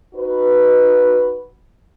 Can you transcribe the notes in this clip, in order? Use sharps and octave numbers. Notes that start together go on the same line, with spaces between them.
D#4 F#4 B4